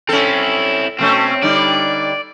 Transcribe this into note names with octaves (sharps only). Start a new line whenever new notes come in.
C4 C#4 E4 A4
B2 A3 C4 C#4
D3 G3 D#4 D5